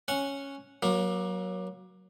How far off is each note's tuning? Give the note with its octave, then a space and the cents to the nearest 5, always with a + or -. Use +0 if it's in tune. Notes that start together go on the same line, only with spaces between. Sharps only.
C#4 +0 F#5 -10
F#3 +0 A#3 +30